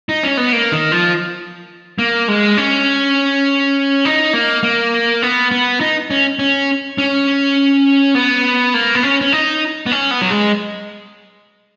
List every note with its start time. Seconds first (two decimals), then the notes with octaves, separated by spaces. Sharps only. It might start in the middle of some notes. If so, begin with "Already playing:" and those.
0.09 D#4
0.23 C#4
0.37 B3
0.53 A#3
0.72 D#3
0.92 F3
1.99 A#3
2.28 G#3
2.57 C#4
4.05 D#4
4.33 A#3
4.63 A#3
5.22 B3
5.51 B3
5.81 D#4
6.10 C#4
6.39 C#4
6.98 C#4
8.15 B3
8.74 A#3
8.95 B3
9.03 C#4
9.21 C#4
9.33 D#4
9.86 B3
9.92 C#4
10.11 B3
10.21 F#3
10.30 G#3